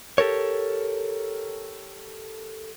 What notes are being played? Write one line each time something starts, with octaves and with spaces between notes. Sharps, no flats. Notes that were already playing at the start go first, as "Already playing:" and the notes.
G4 A4 A#4 C#5